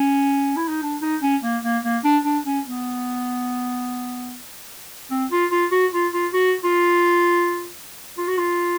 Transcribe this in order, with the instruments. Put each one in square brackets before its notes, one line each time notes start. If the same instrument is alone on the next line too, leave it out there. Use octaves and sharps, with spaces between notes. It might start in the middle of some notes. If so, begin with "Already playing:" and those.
Already playing: [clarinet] C#4
E4
D#4
D4
D#4
C#4
A#3
A#3
A#3
D4
D4
C#4
B3
C4
F4
F4
F#4
F4
F4
F#4
F4
F4
F#4
F4